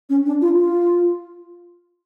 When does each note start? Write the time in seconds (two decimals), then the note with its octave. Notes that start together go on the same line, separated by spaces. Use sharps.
0.10 C#4
0.26 D4
0.41 F4
0.57 F4